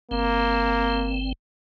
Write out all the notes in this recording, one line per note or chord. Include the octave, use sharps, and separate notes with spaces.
G1 A#3 C4